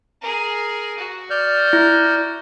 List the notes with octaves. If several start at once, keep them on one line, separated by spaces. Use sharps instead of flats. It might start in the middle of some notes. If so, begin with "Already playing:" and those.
G#4 A#4
F#4
D5 F6 G6
E4